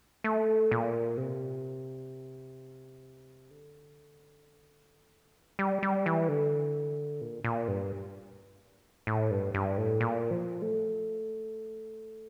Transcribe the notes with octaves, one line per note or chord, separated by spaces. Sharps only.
A3
A#2
C3
D3
E3
A3
G3
G3
E3
D3
A#2
A#2
G2
A2
G2
G2
A2
A#2
F3
A3